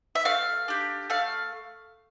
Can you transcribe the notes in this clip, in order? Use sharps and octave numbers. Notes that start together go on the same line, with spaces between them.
E5
A3 F5
D4 G4
A3 F5